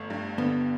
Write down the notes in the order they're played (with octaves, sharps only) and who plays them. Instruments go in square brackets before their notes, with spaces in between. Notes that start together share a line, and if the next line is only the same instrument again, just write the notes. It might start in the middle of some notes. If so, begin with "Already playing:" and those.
Already playing: [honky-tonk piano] G1 [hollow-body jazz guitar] A3
[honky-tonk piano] G2
[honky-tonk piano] D3 [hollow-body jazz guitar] B3